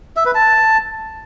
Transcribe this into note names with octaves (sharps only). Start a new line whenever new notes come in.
E5
B4
A5